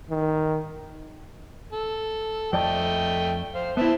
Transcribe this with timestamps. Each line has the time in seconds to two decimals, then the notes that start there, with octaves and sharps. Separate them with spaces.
0.11 D#3
1.72 A4
2.53 F2 A3 D5 D#5 G5 A5
3.55 C5 F5
3.77 B3 C4 E4 E5 A5